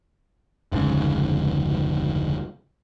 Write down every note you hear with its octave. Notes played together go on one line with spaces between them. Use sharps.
F1 D2 G#2 C#3